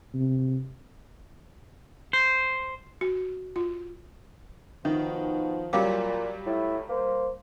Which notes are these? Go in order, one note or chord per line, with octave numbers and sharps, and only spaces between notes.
C3
C5
F#4
F4
B2 D#3 F3 D#5 E5
A#2 F#3 G3 F5 G5 D6
A2 E4
A#3 C5